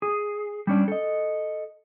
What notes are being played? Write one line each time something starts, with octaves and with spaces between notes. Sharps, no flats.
G#4
G3 C#4 D4
A4 D#5